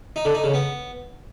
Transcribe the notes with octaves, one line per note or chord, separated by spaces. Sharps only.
D#4
D3
D#4
C#3
B3